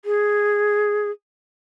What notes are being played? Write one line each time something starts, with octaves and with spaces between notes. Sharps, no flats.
G#4